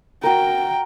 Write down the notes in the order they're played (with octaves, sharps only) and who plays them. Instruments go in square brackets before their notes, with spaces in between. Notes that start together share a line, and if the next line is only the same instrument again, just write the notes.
[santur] F#4 A#4 [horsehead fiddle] G5